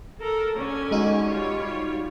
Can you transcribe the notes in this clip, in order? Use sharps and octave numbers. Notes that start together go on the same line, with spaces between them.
A4 A#4
D3 C#4 G#5
G#3 D#4 F#4
G3 F4 C#5